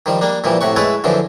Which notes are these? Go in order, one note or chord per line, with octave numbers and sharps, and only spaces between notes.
D#3 F3 G3
G3 A#3 D4
A#2 E3 F3 G3
A2 C3 F#5 C#6
G#3 A3 E4 A4 B4 C#5
F#2 D3 E3 F3